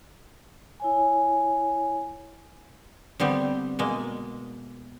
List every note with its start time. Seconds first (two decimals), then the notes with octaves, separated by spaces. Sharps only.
0.80 E4 C#5 G#5
3.20 D3 G3 B3 C4
3.79 B2 G#3 A#3